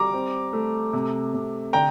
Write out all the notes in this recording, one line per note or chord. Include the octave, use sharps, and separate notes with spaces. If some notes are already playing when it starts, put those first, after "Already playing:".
Already playing: G3 A#5 D6
C4
A3
C3
C3
D3 G5 A#5